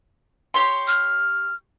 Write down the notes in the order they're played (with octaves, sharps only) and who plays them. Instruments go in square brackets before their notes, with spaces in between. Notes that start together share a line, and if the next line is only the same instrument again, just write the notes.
[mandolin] G4 C#5 C6
[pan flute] F6